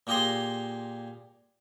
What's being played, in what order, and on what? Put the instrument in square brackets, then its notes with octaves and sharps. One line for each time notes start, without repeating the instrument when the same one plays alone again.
[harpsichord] A#2 A#3 G4 G#4 A#5 C6